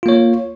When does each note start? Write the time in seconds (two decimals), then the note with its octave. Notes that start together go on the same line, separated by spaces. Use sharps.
0.03 F4
0.06 A#3
0.09 C#5